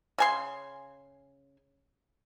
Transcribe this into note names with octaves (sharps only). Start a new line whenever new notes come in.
C#3 G#5 C6